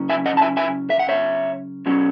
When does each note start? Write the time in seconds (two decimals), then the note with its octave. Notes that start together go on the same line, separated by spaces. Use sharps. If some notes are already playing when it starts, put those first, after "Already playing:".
Already playing: C#3 F#3 C#4
0.10 E5 G#5
0.26 D#5 F#5
0.37 A5
0.41 E5 G#5
0.57 E5 G#5
0.90 E5
0.99 F#5
1.09 C#5 E5
1.86 B2 F#3 C#4